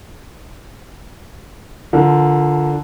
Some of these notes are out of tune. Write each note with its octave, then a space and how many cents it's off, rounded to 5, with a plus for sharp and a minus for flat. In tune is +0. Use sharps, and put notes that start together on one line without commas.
D3 -10 F3 -10 A#4 +10